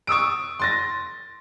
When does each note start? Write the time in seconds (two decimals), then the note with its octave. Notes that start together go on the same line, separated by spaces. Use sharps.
0.07 C#6 D#6 E6 D7
0.60 C6 A6 A#6